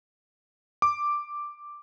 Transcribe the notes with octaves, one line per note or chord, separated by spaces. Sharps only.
D6